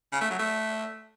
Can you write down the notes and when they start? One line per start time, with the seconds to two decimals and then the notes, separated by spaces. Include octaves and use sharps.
0.12 C#3
0.21 A3
0.30 F#3
0.39 A3